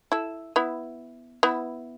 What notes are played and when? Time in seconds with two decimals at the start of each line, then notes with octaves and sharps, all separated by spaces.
0.12 E4 A4
0.56 B3 E4
1.43 B3 E4